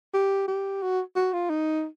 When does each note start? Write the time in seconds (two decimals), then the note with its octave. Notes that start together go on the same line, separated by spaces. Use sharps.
0.14 G4
0.48 G4
0.82 F#4
1.16 F#4
1.33 F4
1.50 D#4